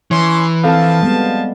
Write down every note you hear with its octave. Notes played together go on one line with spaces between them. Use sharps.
E3 C#4 C#5 C6
D3 F3 C4 A4 F5 A5
G3 G#3 B3